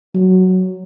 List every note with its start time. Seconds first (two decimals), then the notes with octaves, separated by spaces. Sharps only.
0.14 F#3